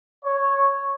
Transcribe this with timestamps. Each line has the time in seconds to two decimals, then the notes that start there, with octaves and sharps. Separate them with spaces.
0.25 C#5